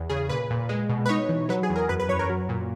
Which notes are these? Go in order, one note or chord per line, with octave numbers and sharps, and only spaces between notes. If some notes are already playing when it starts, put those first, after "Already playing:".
Already playing: E2
C#3 G#4
A#2 B4
A#2
G#3
B2
B4
D#4 C#5
E3
F#3 B4
G#4
E2
A#4
F#2 B4
B4
F#2 C#5
A#4
F#3
A#2